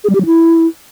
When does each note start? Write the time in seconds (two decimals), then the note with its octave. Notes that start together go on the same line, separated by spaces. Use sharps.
0.04 G#4
0.10 G3
0.15 G4
0.20 F#3
0.26 E4